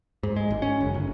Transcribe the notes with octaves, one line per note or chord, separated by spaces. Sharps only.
G#2
G#3
G#1
C#4
F#1
G1